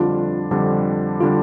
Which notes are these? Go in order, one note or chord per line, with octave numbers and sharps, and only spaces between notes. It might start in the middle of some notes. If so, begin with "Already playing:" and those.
Already playing: F2 D3 G3 D4 F4
F2 D3 G3 D4
D3 G3 D4 F4